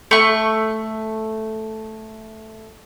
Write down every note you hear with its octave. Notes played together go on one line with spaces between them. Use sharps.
A3 C#6